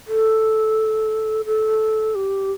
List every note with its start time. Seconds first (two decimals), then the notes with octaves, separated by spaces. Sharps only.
0.08 A4
1.46 A4
2.15 G4